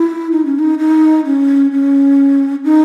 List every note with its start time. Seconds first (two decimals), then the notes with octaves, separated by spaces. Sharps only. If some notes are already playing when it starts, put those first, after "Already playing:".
Already playing: E4
0.32 D#4
0.46 C#4
0.59 D#4
0.79 D#4
1.25 C#4
1.72 C#4
2.64 D#4